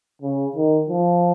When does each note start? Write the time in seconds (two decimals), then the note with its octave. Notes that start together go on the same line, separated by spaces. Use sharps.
0.22 C#3
0.56 D#3
0.89 F3